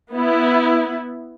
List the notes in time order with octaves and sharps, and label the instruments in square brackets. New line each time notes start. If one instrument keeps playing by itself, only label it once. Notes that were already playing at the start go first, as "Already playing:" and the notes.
[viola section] B3 E4